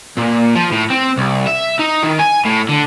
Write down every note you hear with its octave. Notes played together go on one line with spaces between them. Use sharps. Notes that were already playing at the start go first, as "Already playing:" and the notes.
A#2
F3
A2
C4
C2
E5
D#4
D#3
G#5
A2
D3